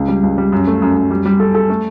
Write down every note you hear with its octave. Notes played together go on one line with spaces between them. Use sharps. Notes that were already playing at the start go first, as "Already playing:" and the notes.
Already playing: C#2
G3
C#2
G3
F#2
A3
F#2
F#2
G3
G3
A4
A4
A3